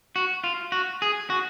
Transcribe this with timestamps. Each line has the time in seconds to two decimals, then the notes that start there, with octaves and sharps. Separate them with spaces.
0.16 F#4
0.44 F4
0.72 F#4
1.02 G#4
1.30 F#4